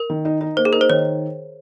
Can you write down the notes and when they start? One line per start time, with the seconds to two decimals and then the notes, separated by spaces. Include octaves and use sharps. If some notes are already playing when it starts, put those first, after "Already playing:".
Already playing: A#4
0.10 D#3
0.25 D#4
0.41 D#4
0.57 A#3 C5
0.65 G#4
0.73 D#4 A#4
0.81 C5
0.89 D#3 C#5